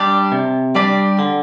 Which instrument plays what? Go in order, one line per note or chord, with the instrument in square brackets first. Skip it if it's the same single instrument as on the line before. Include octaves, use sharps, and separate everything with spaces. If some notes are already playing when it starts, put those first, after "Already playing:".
Already playing: [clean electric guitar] G3 D4 G4 D5
C3
G3 D4 G4 D5
D3